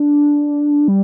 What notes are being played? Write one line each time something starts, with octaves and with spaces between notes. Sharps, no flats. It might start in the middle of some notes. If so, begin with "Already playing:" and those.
Already playing: D4
G3